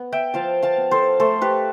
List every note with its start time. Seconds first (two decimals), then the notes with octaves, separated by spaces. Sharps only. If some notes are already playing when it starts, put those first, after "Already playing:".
Already playing: B3
0.12 E5 G5
0.34 F3 F5 A5
0.63 F5 A5
0.77 B3
0.91 A4 C5
1.20 A3 A4 C5
1.42 G4 B4